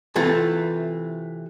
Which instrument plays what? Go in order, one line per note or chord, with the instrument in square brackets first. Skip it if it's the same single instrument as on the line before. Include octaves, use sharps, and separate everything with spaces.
[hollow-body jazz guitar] C3 E3 A3 F4